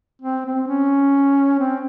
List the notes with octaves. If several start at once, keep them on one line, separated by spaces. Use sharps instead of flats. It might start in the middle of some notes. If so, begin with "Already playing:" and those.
C4
C4
C#4
C4